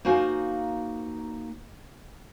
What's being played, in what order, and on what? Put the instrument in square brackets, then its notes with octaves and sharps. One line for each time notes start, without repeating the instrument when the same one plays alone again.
[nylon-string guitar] A#3 D#4 F#4 C5 F5 G#5